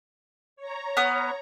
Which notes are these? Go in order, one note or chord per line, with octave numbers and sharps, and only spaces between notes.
C#5 A#5
B3 D#6 F6